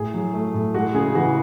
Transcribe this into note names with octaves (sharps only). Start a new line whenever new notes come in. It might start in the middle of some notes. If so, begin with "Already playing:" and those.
Already playing: A2 G#4
F#3
A3
A2
G#3 F#4
C#3 G#4
E3 F#4